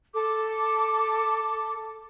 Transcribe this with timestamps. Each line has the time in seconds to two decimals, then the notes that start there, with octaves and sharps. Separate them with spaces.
0.14 A4 D6